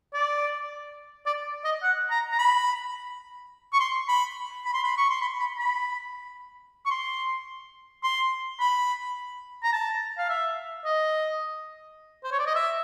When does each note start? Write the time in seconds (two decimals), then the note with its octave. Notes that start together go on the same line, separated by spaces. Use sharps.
0.14 D5
1.26 D5
1.65 D#5
1.83 F#5
2.11 A#5
2.32 A#5
2.39 B5
3.73 C#6
3.80 C6
4.08 B5
4.65 B5
4.74 C6
4.83 B5
4.98 C#6
5.10 C6
5.21 B5
5.40 B5
5.58 B5
6.85 C#6
6.91 C6
8.03 C6
8.60 B5
9.63 A#5
9.73 A5
10.18 F5
10.29 E5
10.85 D#5
12.24 C5
12.32 C#5
12.39 D5
12.47 D#5
12.55 E5